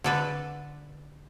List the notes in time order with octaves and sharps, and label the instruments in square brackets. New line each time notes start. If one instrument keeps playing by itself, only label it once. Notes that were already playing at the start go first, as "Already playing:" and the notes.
[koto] D3 A4 B4